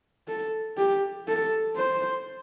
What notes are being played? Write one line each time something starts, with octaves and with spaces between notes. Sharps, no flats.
A4
G4
A4
C5